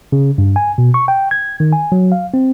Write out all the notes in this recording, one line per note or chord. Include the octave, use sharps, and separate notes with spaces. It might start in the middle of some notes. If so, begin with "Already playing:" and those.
C#3
G2
G#5
B2
C#6
G5
G#6
D#3
G#5
F#3
F5
C4